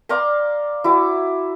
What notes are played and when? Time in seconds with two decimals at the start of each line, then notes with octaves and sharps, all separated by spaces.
0.09 D5 F5 A#5 C6
0.84 E4 F#4 D6